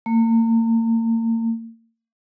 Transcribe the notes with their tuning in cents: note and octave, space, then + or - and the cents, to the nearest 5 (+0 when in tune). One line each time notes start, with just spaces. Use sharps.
A#3 -40